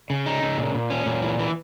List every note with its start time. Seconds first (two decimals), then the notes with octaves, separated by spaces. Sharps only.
0.10 C#3
0.26 D#4
0.43 C#3
0.58 A#2
0.75 A#2
0.90 C#4
1.06 A#2
1.22 E3
1.39 E3